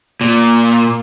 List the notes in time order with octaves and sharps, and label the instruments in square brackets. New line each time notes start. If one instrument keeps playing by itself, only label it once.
[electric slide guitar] A#2